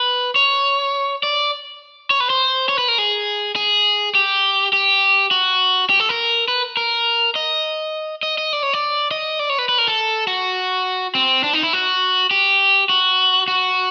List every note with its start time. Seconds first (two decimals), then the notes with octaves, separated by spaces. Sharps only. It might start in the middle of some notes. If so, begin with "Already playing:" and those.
Already playing: B4
0.36 C#5
1.23 D5
2.10 C#5
2.20 B4
2.30 C5
2.69 C#5
2.78 B4
2.88 A#4
2.98 G#4
3.56 G#4
4.15 G4
4.73 G4
5.31 F#4
5.90 G4
6.00 A4
6.09 A#4
6.48 B4
6.77 A#4
7.35 D#5
8.23 D#5
8.38 D#5
8.53 D5
8.63 C#5
8.73 D5
9.11 D#5
9.39 D5
9.49 C#5
9.59 B4
9.69 B4
9.78 A#4
9.88 A4
10.27 F#4
11.15 C4
11.44 D4
11.53 D#4
11.63 E4
11.73 F#4
12.31 G4
12.89 F#4
13.48 F#4